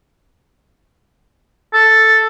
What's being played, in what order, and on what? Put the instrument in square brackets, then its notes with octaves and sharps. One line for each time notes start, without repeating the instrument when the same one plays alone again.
[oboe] A4